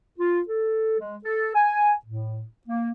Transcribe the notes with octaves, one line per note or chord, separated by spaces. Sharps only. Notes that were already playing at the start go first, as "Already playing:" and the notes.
F4
A4
G#3
A4
G#5
A2
A#3